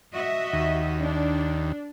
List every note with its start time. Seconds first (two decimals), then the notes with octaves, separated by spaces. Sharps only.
0.13 F#4 D#5 E5
0.53 D#2
1.02 D4